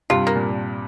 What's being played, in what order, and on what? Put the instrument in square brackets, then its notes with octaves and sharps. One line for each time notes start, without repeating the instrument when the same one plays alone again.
[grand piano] G2 C3 [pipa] F4
[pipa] A#3
[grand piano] A#2